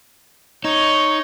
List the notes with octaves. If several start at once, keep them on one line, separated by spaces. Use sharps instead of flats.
D#4 C#5